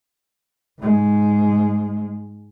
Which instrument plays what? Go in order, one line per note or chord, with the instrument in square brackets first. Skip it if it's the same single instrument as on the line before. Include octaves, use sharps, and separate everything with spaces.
[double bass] G#2 G#3